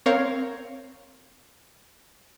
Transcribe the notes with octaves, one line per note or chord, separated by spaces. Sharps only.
C4 A#4 C#5 F5